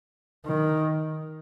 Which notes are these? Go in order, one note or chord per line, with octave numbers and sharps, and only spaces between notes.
D#3